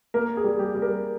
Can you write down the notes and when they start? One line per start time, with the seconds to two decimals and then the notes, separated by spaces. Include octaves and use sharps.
0.14 A#3 A#4
0.37 G#4
0.44 G3
0.59 G4
0.75 G3
0.82 A#4